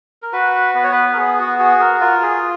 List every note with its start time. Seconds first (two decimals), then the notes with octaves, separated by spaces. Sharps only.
0.22 A#4
0.32 F#4 B4
0.75 B3 B4
0.84 C#5
0.92 B4
1.12 A#4
1.17 B3 G#4
1.39 F#4
1.59 F#4 G#4
1.80 A#4
2.01 F4 A#4
2.22 G#4